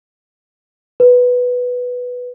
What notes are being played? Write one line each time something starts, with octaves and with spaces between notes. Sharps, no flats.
B4